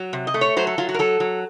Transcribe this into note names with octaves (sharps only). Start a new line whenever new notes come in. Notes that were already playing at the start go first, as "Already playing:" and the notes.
Already playing: F#3
C3
D#5
A3
C#5
F#3 C5
A4
F#3 F4
F#4
A#4
F#3 A4
F#3